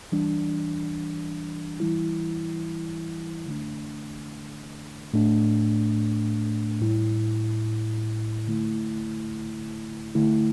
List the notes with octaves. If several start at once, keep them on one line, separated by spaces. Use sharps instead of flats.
E3 G3 D4
E3 G3 E4
D3 A3 D4
A2 A3 D4
A2 G3 E4
D3 A3 E4
D3 A3 E4